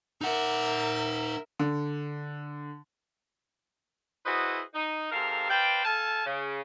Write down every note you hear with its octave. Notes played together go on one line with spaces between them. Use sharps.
D#4 A#4 E5 F#5
D3
E4 F#4 G#4 B4 C5 D#5
D#4
G#2 C3 A4 A#4 F5
B4 C5 D5 F5 G5
A4 F5 G#5 A5
C#3